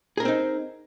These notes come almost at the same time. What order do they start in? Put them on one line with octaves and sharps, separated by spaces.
G#4 A#4 C#4 C4 D#4